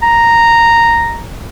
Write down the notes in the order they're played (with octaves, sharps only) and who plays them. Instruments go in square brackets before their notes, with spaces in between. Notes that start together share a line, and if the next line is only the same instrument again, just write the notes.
[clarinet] A#5